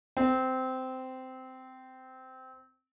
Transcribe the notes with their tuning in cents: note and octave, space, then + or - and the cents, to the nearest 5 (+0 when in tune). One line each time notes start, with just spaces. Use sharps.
C4 -15